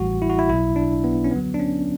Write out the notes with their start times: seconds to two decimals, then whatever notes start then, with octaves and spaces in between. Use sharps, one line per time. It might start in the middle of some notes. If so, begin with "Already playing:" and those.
Already playing: A1 A2 E3 G3 F#4
0.22 E4
0.30 F#4
0.39 E4
0.49 B1 B2 F#3 E4
0.76 D4
1.04 B3
1.24 C#4
1.31 D2 D3 F#3 B3
1.54 D4
1.59 C#4